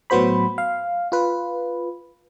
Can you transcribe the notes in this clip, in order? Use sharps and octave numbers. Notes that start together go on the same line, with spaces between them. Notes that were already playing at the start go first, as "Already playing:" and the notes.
A2 F#3 B3 F#4 C5 B5
F5
F4 B4